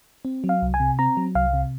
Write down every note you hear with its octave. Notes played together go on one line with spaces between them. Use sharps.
C4
F#3
F5
C2
G#5
C3
C4 A#5
F#3
C2 F5
C3